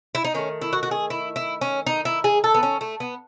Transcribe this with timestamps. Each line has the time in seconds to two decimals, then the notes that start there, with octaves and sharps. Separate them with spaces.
0.15 E4
0.24 D#4
0.34 D#3 A3 C#4
0.61 E4
0.73 F#4
0.83 F#4
0.91 G#4
1.10 E4
1.36 E4
1.61 C#4
1.87 D#4
2.05 E4
2.24 G#4
2.44 A4
2.54 B3
2.63 C#4
2.81 A3
3.00 B3